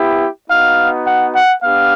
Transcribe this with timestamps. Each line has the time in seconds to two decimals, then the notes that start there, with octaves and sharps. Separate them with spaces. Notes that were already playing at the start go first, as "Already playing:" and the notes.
Already playing: B3 E4 G4
0.50 B3 D#4 F#4 F5
1.06 F#5
1.35 F#5
1.63 B3 D4 G4 F5